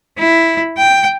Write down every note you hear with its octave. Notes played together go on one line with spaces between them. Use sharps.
E4
G5